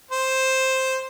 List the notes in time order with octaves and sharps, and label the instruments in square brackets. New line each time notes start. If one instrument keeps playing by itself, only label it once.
[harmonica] C5